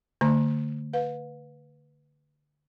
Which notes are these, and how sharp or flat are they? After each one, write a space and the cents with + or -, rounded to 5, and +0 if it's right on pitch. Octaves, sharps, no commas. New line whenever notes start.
D3 +0 A3 +40 A#5 +10
B4 +0 F5 +40